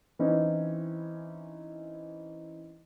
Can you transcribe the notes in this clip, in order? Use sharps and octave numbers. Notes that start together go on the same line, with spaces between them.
E3 C4 C#4 D#4 E4